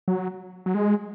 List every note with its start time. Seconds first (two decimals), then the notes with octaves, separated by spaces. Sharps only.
0.08 F#3
0.66 F#3
0.74 G#3